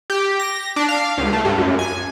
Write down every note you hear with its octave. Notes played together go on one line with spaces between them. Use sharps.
G4
A#6
D4
F5
C#2
A3
G2
F#2
G#5